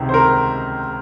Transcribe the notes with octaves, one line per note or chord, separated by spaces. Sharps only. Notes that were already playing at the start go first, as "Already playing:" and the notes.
Already playing: C#2 C3 D#3
C5
A#4